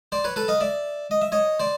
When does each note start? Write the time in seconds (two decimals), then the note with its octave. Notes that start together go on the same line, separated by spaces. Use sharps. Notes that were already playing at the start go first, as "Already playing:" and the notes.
0.12 C5 D5
0.24 B4 C#5
0.36 A4 B4
0.48 D#5 F5
0.61 D5 E5
1.11 D#5
1.22 E5
1.32 C#5 D#5
1.60 C5 D5